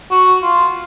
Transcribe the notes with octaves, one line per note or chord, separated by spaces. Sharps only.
F#4
F4